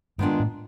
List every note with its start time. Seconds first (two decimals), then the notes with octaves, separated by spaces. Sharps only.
0.18 G2 D#3 G#3 B3 D4 F4
0.40 A2